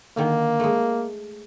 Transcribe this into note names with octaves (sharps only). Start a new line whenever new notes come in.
D3 D#3 A#3
G#3 A3